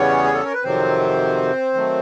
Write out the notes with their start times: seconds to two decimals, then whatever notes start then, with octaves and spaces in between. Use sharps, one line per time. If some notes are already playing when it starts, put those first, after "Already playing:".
Already playing: E2 C#3 E3 G3 B3 C#4 C#5
0.24 G#4
0.34 A4
0.45 A#4
0.54 B4
0.63 F2 C3 D#3 F#3 C4 C5
1.74 D#3 F#3 A3